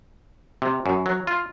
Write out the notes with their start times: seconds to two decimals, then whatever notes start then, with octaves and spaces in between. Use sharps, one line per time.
0.62 C3
0.86 F#2
1.06 F#3
1.27 F4